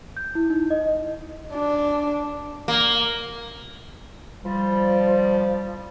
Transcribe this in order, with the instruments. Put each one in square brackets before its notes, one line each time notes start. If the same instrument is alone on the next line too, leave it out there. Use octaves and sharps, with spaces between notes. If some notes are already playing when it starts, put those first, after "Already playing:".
[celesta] G6
E4
D#4
D#5
[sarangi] D4
[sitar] A#3
[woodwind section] F3 G3